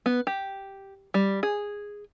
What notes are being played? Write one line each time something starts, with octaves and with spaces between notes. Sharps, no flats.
B3
G4
G3
G#4